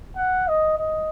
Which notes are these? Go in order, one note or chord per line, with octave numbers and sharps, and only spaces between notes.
F#5
D#5
D#5